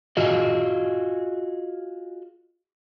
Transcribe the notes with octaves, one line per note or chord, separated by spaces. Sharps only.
F4 F#4 G#4 D#5